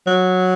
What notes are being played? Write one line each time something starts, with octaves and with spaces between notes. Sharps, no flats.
F#3